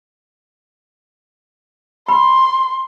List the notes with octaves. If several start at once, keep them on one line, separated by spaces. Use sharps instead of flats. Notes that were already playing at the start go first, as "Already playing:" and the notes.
B5 C6